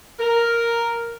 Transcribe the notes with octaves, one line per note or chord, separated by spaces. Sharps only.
A#4